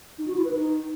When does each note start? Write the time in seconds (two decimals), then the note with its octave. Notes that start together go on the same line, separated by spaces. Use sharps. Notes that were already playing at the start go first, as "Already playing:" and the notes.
0.18 D#4
0.27 F#4
0.36 E4
0.45 B4
0.54 D#4